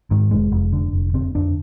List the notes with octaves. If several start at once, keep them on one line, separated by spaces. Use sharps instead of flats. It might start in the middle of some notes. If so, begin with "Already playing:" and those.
G#2 D#3
F1 G#3
F1
D3
F1
D3 C4
F2 D4